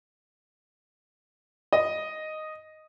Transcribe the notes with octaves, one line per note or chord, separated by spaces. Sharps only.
D#5